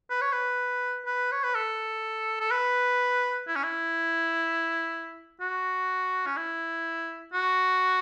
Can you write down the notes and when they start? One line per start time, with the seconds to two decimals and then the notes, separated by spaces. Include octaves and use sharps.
0.10 B4
0.21 C#5
0.32 B4
1.06 B4
1.32 C#5
1.43 B4
1.55 A4
2.40 A4
2.51 B4
3.47 E4
3.56 C#4
3.64 E4
5.41 F#4
6.26 C#4
6.37 E4
7.33 F#4